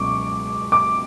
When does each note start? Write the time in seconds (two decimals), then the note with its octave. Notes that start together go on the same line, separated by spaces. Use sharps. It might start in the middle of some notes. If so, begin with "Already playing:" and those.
Already playing: C#2 B2 F#3 C#6 D6
0.72 D6